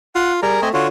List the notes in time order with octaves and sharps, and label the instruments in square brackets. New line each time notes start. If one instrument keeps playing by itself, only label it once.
[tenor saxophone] F4 [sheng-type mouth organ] F#5
[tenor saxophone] G3 [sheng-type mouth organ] G#4 A#4 A#5
[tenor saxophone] A3 [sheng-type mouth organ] C4 D#5 G#5
[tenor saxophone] D3 [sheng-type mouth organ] F4 F#4 C#5